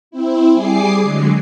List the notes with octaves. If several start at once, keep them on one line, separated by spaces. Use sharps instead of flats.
C4 E4
G3 G#4 G#5 D6 C7
D3 F#3 G#3